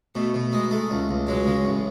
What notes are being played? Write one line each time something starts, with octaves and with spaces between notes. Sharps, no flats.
B2 A3
B2
G#3 D#4
A3
C#2
C#2
F#3 G#3
C#3
A1